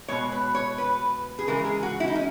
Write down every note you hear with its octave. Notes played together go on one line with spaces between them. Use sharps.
B2 G#3 C#5
B4
C#5
B4
G#4
C#3 E3 G#3 A#4
G#4
F#4
E4
D#4
C#4